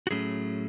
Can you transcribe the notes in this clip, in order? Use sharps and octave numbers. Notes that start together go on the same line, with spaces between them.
F#4
A2 F#3 A3 C#4 G#4